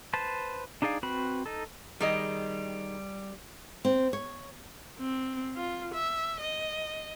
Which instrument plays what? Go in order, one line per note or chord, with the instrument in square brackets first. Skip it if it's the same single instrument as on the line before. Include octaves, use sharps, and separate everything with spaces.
[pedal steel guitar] B4 C5 A5
D4 D#4 G#4 D5 F5
C4 F#4 B4 B5
D#4 A4
[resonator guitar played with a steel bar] D#3 G#4 D#5 [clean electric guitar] G3
[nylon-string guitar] C4
C#5
[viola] C4
F4
E5
D#5